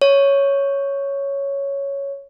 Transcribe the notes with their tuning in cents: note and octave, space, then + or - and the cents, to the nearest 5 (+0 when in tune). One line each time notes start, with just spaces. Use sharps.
C#5 +5